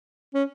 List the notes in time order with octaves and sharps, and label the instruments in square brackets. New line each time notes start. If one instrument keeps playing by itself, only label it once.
[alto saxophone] C#4